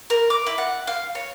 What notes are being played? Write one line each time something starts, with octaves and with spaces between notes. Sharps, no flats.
A#4
D6
E4
F#5
F5
C#5